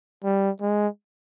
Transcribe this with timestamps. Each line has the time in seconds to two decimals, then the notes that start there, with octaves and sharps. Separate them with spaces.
0.24 G3
0.61 G#3